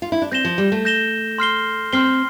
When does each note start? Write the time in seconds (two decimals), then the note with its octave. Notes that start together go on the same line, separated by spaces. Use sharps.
0.02 F4
0.12 E4
0.22 D4
0.32 C4 G6 A#6 E7 G7
0.45 F3
0.58 G3
0.72 A3
0.85 G6 A#6 E7 G7
1.38 C6 F6 C7 G7
1.93 C4 C6 F6 C7 G7